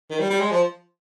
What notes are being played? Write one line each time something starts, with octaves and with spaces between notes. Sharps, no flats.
D#3
G3
G3
G#3
F3